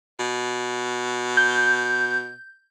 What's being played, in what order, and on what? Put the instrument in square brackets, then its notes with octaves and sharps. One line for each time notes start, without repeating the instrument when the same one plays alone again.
[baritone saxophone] B2
[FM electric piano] G6